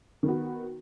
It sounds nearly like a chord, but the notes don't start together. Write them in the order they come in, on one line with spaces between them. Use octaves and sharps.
D#3 B3 F#4